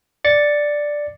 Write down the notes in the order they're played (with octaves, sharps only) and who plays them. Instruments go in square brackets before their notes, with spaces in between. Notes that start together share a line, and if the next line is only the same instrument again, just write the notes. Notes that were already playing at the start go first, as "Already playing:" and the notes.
[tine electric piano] D5 A6 C#7